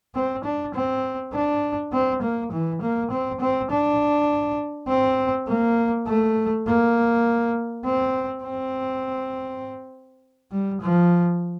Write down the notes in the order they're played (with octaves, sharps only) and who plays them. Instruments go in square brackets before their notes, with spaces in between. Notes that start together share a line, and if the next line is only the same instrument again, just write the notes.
[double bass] C4
D4
C4
D4
C4
A#3
E3
A#3
C4
C4
D4
C4
A#3
A3
A#3
C4
C4
G3
F3